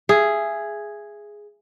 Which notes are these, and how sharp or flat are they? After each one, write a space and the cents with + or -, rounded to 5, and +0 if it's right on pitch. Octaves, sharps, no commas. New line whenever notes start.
G#4 +0 E5 +25